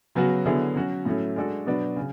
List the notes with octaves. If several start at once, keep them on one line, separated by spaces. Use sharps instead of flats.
C#3 F#3 B3 F#4
D3 F#3 B3 E4 G#4
F#3 C#4 F#4
A2 F#3 A3 C#4
G#3 D4 F#4 A4
B2 F#3 B3 D4 F#4
C#3